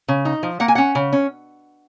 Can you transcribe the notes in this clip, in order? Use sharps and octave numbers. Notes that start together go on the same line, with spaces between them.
C#3
D#4
F3
A#3 F#5
G#5
C#4 F#5
C#3
C#4